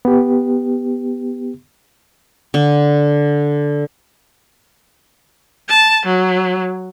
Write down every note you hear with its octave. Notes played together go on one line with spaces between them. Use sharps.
B3 G4
D3
A5
F#3